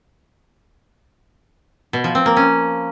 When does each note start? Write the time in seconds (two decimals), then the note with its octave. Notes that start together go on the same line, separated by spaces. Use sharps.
1.93 B2
2.04 F3
2.15 C4
2.26 A#3
2.37 C#4